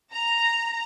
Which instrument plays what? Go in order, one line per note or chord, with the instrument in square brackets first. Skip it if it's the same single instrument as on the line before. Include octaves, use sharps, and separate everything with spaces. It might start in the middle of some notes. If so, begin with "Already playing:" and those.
[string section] A#5